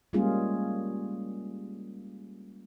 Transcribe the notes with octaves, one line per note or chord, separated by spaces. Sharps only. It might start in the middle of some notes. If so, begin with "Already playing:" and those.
G3 G#3 A#3 C#4 F4 G#4